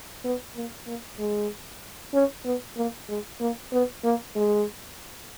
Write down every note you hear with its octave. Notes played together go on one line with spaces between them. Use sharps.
B3
A#3
A#3
G#3
C#4
B3
A#3
G#3
A#3
B3
A#3
G#3